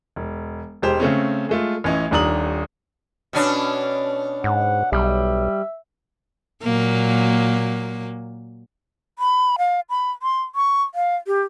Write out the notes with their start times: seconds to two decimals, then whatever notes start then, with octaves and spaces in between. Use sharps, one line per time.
0.16 E1
0.82 E1 G#3 G4 C5
1.00 C#3 A3 C4 C#4
1.49 G#3 A3 F4
1.84 A1 E3 C#4 D#5
2.11 D#1 D#2 D4 A#5 D#6 F#7
3.33 B2 C#4 D4
4.44 G#2 F#5
4.92 B1 G3 E5
6.63 A#2 F#3 A#3
9.19 B5
9.58 F5
9.90 B5
10.22 C6
10.55 C#6
10.95 F5
11.27 G4